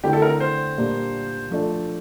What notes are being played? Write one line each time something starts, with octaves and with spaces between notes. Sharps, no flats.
D3 A3 C4 E4 G4
A4
A#4
C5
A#2 G3 A#3 D4
F3 A3 D4 A4